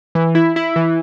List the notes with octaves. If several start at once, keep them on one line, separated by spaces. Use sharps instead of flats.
E3
E4
E4
E3